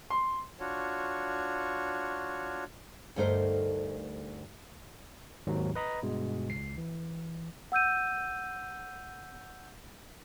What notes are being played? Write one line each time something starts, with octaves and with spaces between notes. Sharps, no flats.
C6
D4 F4 F#4 C#5
D2 G2 A3 D#4 A#4 C5
G#1 D#2 G#2 D#3 F#3
B4 D#5 A#5 B5
G2 B2 G#3
C#2 C7
E3
F#5 E6 G6 D#7